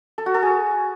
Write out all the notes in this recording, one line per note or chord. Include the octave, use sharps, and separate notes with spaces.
A4
F#4
A4
G#4